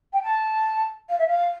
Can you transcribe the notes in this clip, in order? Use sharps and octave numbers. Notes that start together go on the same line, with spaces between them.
G5
A5
F5
E5
F5